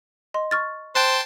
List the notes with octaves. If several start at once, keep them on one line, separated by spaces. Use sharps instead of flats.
D#5 C6
C#6 F6 A6
C5 G5 A5 C6 F#6